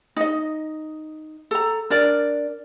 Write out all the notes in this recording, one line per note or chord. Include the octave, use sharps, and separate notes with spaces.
D#4 D#5
A4 A#5
D4 A#4 D5